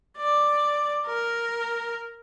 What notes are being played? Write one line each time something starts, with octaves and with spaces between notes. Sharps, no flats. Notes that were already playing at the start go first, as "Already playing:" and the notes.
D5
A#4